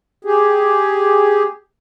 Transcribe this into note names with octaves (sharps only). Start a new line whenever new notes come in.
G4 G#4